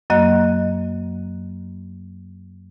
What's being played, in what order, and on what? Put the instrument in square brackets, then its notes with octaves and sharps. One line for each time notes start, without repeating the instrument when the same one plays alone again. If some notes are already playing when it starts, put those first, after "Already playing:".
[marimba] F#2 F#3 A#3 D#5 F#6